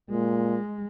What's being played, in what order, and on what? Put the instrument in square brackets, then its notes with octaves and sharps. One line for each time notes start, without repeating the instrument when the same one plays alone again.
[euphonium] A#2 [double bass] G#3